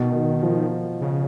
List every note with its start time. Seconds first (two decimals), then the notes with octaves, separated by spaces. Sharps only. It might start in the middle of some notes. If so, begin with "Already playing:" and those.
Already playing: B2 D#3
0.13 B2
0.43 F3
1.01 C#3